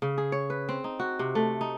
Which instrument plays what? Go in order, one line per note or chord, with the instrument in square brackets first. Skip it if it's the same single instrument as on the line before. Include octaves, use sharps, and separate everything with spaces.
[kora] C#3
G#4
C#5
B4
C4
D#4
F#4
C3
A3
D#4